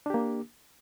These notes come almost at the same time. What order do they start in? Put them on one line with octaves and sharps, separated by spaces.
D4 G4 A#3